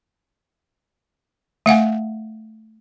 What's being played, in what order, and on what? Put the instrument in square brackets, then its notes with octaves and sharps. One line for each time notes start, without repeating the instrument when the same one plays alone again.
[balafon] A3 F5 F#5 G#5